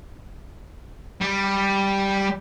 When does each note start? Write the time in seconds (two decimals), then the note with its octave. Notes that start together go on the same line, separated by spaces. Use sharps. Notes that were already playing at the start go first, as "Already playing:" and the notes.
1.21 G3